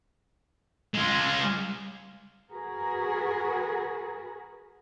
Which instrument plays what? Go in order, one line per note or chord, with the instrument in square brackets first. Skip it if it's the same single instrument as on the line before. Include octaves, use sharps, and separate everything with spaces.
[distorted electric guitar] G#3 F4
[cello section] F#4 G#4 A#4 B4